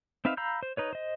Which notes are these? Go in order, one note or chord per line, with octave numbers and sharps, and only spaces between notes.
C4 D#4 B4 E5 F5
F5 A#5 B5 E6 G6
C5
D#4 B4 C#5
C5 D#5